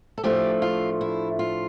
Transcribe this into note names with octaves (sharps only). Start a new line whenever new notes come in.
A4
A2 F3 A3 D4 G4
F4
E4
F4